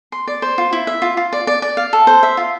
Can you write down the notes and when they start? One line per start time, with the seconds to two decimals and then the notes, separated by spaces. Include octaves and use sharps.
0.12 C6
0.27 D5
0.42 C5
0.58 F4
0.73 E4
0.87 E5
1.02 F4
1.17 F4
1.33 D5
1.47 D5
1.62 D5
1.77 F5
1.93 A4
2.07 C5
2.23 E5
2.37 F4